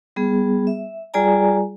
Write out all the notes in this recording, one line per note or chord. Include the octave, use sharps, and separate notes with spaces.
G3 B3 G#4
E5
G3 F4 G#4 D5 G#5 A#5